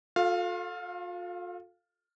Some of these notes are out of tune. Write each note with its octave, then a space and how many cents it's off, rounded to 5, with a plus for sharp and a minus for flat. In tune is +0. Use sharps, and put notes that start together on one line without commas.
F4 +40 A4 +0 F5 +0